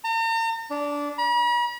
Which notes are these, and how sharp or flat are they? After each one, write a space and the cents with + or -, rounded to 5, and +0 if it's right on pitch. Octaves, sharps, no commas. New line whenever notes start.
A#5 -45
D4 -15
B5 -45